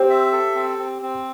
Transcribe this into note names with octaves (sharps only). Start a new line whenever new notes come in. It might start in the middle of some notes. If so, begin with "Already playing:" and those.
Already playing: C4 G4 C5
E5
A4
C4
C4
C4